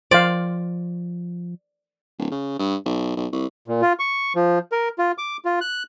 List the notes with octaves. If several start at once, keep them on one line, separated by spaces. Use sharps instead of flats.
F3 C5 D5 F5
D1
C#3
G2
B1
B1
C2
A#2
F4
C#6
F3
A#4
F4
D6
F4
F#6